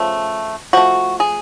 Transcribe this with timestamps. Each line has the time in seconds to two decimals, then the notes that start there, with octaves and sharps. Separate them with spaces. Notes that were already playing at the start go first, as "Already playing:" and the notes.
Already playing: C#3 F3 A3
0.73 F3 A3 F#4
1.20 G#4